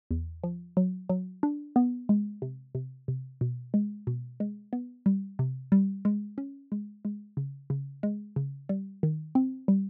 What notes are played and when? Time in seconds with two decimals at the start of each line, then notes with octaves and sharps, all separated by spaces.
0.11 E2
0.44 F3
0.77 F#3
1.09 F#3
1.43 D4
1.76 B3
2.09 G#3
2.42 C3
2.75 C3
3.08 C3
3.41 B2
3.74 G#3
4.07 B2
4.40 G#3
4.73 B3
5.06 G3
5.39 C3
5.72 G3
6.05 G#3
6.38 C#4
6.72 G#3
7.05 G#3
7.37 C#3
7.70 C#3
8.03 G#3
8.36 C#3
8.69 G3
9.03 D#3
9.35 C4
9.68 G3